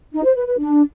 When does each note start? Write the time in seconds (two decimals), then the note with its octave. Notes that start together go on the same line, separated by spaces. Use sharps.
0.13 D#4
0.24 C5
0.35 B4
0.46 B4
0.58 D4